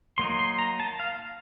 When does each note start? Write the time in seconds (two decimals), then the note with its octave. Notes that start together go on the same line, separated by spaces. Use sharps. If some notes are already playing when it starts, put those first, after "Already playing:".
0.18 F#3 A#3 D#4 C6
0.39 C6
0.59 A#5
0.80 A5
1.00 F5